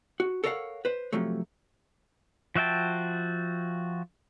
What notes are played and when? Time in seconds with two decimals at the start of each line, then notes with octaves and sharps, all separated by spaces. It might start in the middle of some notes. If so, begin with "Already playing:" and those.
0.20 F#4
0.44 A4 A#4 C#5 D#5 F5 F#5
0.85 B4 C5
1.13 C3 F3 F#3 A3
2.55 F3 F#4 E5 G5 A5